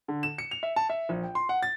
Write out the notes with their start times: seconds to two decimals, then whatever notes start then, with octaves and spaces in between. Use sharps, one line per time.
0.08 D3
0.23 E7
0.38 C#7
0.51 F7
0.63 E5
0.76 A5
0.90 E5
1.09 A#1
1.23 G5
1.35 C6
1.49 F#5
1.63 A6